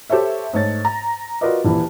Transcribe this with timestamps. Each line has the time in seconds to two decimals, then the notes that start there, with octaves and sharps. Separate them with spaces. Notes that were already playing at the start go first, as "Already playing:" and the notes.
0.10 G4 A4 C5 C#5 E5
0.53 G#2 A3 C#5 A6
0.85 A#5
1.41 F4 F#4 A#4 B4 D5 D#5
1.64 D#1 A#2 E3 E4